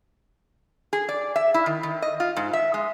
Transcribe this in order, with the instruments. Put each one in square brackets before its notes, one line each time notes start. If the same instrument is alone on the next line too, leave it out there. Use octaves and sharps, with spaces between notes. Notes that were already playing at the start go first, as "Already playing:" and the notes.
[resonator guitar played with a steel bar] G#4
D5
E5
E4
D#3
D#3
D#5
F4
G#2
E5
G#3